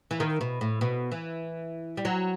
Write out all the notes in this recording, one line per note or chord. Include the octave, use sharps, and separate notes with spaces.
E3
D#3
B2
A2
B2
E3
G3
F#3